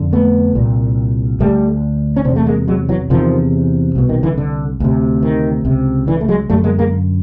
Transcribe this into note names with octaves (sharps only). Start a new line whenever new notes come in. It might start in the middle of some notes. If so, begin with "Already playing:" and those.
Already playing: F2 D3
A3 B3
C2 A#2
D2 D3 G3 A3
C#4
E2 C3 C4 D4
A3
G#3 A#3
F#3 G#3
E3 F#3
E2 C3 D#3 F3
C2 B2
D#3
D3 E3
D3
D2 C3
D#3
C#2 C3
D3 E3
A3
F#3 G#3
F#2 D3 G3 A3
G#3 A#3
G#3 A#3